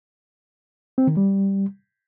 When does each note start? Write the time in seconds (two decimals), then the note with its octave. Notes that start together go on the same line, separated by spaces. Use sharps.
0.98 C4
1.07 D#3
1.17 G3